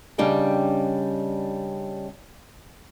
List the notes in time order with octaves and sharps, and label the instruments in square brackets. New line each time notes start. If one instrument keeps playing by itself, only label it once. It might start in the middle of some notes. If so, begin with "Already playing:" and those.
[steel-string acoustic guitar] C#3 G3 D4 D#5 G5